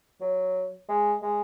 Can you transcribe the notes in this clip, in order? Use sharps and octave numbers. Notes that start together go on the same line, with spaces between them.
F#3
G#3
G#3